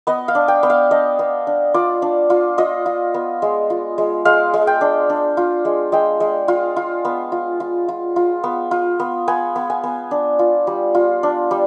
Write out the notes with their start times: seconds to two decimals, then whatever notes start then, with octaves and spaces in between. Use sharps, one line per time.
0.07 B3 D#5
0.28 F5
0.35 D4
0.48 G5
0.63 B3
0.70 F5
0.91 D4 D#5
1.19 B3
1.47 D4
1.74 F4 D5
2.02 D4
2.30 F4
2.58 F4 D#5
2.86 F4
3.14 B3
3.42 G#3
3.70 F4
3.98 G#3
4.25 G#3 F5
4.54 G#3
4.67 G5
4.81 D4
5.09 D4
5.37 F4
5.65 G#3
5.92 G#3 G5
6.20 G#3
6.48 F4
6.76 F4
7.05 B3
7.32 F4
7.60 F4
7.88 F4
8.16 F4
8.44 B3
8.71 F4
9.00 B3
9.28 B3 G#5
9.56 B3
9.70 G#5
9.83 B3
10.11 D4
10.39 F4
10.67 G3
10.95 F4
11.23 D4
11.51 G3